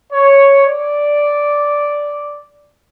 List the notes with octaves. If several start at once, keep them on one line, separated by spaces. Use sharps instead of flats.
C#5
D5